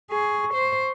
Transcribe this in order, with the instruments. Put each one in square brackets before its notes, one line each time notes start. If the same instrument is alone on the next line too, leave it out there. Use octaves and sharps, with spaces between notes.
[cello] G#4 [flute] C#6
[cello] C5